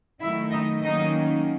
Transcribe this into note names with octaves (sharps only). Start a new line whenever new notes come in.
D#3 F#3 A3 E4 E5
D#4 D#5
D#3 F#3 A#3 C#4 D#4 D#5